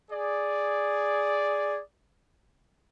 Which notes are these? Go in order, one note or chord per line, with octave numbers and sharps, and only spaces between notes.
G#4 D5